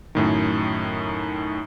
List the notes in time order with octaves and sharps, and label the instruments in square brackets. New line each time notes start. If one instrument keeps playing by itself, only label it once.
[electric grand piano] F#2 A2 D#3